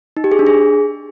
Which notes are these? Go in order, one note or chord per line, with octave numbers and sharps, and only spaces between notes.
D#4
G4
G#4
D4
G#4